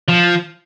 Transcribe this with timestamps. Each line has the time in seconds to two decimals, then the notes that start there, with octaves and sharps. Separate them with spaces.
0.09 F3